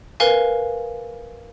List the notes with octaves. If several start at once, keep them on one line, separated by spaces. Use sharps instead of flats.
A#4 B4 F5 G#5